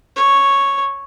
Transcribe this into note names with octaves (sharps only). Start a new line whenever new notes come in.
C#5